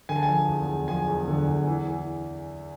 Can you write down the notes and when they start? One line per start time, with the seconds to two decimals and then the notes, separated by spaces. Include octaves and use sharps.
0.09 D3 G#5
0.16 A5
0.23 G#5
0.29 F3
0.48 E2
0.68 E2
0.88 F3 G#5
1.08 E2
1.28 D3
1.47 E2
1.67 E3
1.87 E3